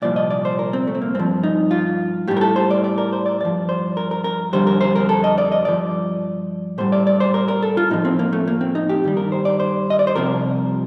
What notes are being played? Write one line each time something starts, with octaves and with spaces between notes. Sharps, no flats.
C2 A#2 F3 D5
D#5
D5
C5
A#4
C4
A3
C4
A#3
G2 F3 C4
D#4
F4
A2 G3 G4
A#4
A4
C5
D5
D5
A#4
C5
D5
G2 F3 D5
C5
A#4
A#4
A#4
F2 D3 G3 C5
A#4
C5
A#4
A4
D#5
D5
D#5
G2 F3 D5
A2 G3 C5
D5
D5
C5
A#4
A#4
A4
F4
A2 F3 D#4
C4
A#3
A3
A#3
C4
D#4
G4
G2 D#3 G3
A#4
C5
D5
C5
D#5
D5
C5
C2 C3 F3 A#4